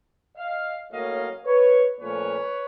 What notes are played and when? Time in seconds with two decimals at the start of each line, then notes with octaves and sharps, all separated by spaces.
0.37 D#5 F5
0.91 A2 F#3 A#3 C#4 D#5 F5
1.45 B4 C#5
1.99 A#2 F3 A3 C#4 B4 C#5